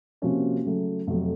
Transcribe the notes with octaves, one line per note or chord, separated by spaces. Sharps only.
C3 F3 A#3 C#4 F#4
C#3 F#3 A3
F2 C3 F#3 A3